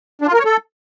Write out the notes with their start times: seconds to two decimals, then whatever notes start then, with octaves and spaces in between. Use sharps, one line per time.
0.22 D4
0.28 F4
0.33 A#4
0.39 C#5
0.45 A4